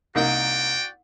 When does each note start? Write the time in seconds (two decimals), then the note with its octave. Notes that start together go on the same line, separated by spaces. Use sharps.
0.15 C2 A#3 D#4 F#4 D5 G5